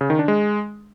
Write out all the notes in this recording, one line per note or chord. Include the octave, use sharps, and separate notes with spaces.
C#3
D#3
D4
G#3